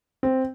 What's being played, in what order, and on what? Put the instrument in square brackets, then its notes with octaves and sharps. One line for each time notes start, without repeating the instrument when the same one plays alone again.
[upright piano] C4